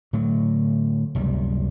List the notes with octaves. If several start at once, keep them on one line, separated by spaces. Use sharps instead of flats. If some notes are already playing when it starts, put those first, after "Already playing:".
A2 D3 F#3
F#1 C#2 C3 G3